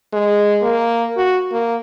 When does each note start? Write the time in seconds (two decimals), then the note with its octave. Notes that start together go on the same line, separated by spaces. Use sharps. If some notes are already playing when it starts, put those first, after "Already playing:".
0.13 G#3
0.62 A#3
1.17 F#4
1.52 A#3